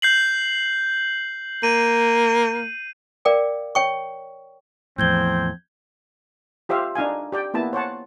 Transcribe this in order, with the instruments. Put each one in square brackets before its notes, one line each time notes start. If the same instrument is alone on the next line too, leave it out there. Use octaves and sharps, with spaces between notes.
[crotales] G6 C7 F#7
[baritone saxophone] A#3 [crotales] D#7
[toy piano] A#4 D5 F5 G5 D6
C#5 G5 C#6
[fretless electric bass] E2 A2 [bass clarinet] F3 [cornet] C4 [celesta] G6 G#6 G7
[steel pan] F4 G4 C5 E5 F5
D4 D#4 F5 G#5
G4 D5 G5
A#3 B3 E4 A5
C5 C#5 F#5 A5